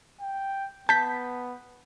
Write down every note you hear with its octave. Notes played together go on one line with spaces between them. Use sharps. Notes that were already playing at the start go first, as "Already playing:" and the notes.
G5
B3 A5 G6 B6